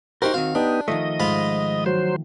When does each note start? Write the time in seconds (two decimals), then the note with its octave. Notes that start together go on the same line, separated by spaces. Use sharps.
0.22 D#4 F#4 G4 A#4 C5
0.34 D#3 C4 F#4 F5
0.55 B3 D4 D#4 G4
0.88 D#3 F3 A3 D#5
1.20 G#2 F4 B5
1.86 F#3 C5